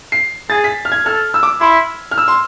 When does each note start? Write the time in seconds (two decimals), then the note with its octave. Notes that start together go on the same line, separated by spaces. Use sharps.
0.12 C7
0.50 G#4 A6
0.64 B6
0.85 F6
0.92 G#6
1.06 A4 F6
1.34 E6
1.43 D6
1.61 E4 C6
2.11 F6
2.18 E6
2.28 C6